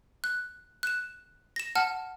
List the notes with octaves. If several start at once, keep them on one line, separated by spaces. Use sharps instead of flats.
F#6
F#6 E7
A#6 E7
F#5 A5 F6